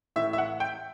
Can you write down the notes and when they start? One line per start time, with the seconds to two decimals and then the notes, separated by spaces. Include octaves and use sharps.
0.16 A2 E3 E5
0.33 E5
0.38 F#5
0.60 G5